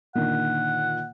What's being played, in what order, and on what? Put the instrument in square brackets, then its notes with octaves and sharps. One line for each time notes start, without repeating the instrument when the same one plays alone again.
[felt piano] A#2 D3 D#3 [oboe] F#5